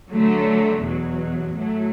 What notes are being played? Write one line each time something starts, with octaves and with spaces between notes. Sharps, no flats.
D3 F#3 A3
E2 B2 F#3
A2 F#3 A3